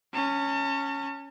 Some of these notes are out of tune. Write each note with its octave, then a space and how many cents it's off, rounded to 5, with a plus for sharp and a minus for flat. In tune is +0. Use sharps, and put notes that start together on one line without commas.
C#4 +0 A5 +40